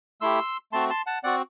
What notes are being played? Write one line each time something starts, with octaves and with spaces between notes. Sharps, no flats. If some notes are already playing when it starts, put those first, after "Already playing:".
A3 E4 G4 C6 E6
A3 C4 F#4 A5 C6
A5 C6
F#5 A5
C4 F#4 D5 F#5